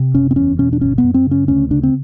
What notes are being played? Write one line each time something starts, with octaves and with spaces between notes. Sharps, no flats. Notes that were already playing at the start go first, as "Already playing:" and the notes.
Already playing: C3
F#1 C#4
C4
E2 C#4
B2 C#4
D4
G1 C#4
B3
F#2
C4
C#3
C#4
D2 C#4
C#3 D4
C4